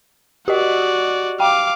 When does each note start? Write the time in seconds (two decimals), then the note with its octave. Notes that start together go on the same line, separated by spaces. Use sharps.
0.48 F#4 G4 D5 D#5
1.40 F5 G5 D6